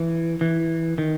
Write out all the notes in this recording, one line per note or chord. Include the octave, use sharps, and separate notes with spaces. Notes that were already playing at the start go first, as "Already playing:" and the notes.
Already playing: E3
E3
D#3